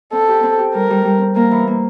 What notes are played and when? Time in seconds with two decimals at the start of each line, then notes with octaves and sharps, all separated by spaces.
0.12 C4 A4
0.29 G4
0.43 C4
0.59 G4
0.74 G3 A#4
0.90 G3
1.05 G3
1.21 C4
1.36 A#3 A#4
1.51 E3
1.67 A#3